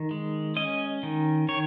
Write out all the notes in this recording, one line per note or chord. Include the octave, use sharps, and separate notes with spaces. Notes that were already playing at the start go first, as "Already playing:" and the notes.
Already playing: D#3
G#3
C#4 D#5
D#3
D#3 C#5